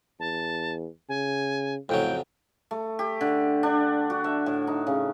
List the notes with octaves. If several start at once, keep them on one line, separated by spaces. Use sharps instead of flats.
E2 A5
C#3 G#5
F2 A2 C#3 F#3 G5
A3
G4
D3
D4
F#4
E5
A2
D#4
C#3